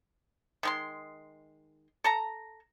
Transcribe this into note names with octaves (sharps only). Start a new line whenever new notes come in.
D#3 G#3 C6
A4 A5 A#5